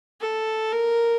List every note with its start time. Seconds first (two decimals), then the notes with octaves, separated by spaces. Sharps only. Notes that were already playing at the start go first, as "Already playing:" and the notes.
0.21 A4
0.72 A#4